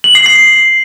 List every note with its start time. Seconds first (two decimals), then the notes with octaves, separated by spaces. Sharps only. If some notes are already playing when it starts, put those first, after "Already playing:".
0.04 F#7
0.15 C7
0.26 C7